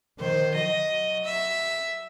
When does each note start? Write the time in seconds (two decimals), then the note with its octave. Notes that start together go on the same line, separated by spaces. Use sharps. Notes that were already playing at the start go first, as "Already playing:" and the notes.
0.20 D#3 C5
0.54 F#3 D#5
1.25 E5